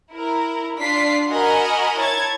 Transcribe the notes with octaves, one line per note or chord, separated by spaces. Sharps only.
E4 A#4
D4 F4 B6 C7
F#4 A#4 D#5 F#5 G#5 B5
E4 C#5 A5 G#6 A6